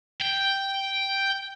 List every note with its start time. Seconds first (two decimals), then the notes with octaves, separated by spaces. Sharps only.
0.21 G5